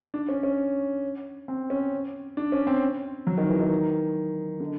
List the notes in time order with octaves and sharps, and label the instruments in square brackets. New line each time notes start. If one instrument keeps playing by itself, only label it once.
[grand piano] D4
C#4
C#4
C4
C#4
D4
C#4
C4
F#3
D#3
E3
D#3
D3